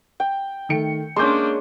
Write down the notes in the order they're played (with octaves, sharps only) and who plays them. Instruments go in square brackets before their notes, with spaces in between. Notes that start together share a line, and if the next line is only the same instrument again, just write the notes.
[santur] G5
[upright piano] D#3 A3 C#7
[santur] G#3 C#4 [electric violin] A#3 D4 [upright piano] C6 D6 G6